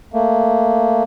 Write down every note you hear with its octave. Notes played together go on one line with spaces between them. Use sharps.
A3 A#3